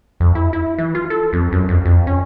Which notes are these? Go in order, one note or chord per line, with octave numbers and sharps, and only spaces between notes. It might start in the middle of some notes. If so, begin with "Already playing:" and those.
F2
E4
E4
E3
F4
A4
F2
F#2
F2
F2
C#4